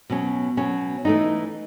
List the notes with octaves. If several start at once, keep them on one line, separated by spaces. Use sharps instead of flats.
B2 F#3 C#4
B2 F#3 C#4
E3 A3 D#4